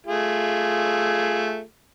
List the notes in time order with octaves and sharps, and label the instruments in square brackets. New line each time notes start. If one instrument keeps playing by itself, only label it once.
[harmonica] A3 F4 G#4